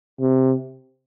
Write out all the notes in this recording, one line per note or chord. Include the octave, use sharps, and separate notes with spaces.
C3